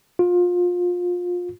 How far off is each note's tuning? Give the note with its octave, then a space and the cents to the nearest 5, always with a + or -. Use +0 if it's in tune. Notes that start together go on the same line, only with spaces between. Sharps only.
F4 +25